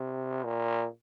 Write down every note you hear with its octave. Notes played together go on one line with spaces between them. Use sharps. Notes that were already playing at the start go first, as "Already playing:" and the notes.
Already playing: C3
A#2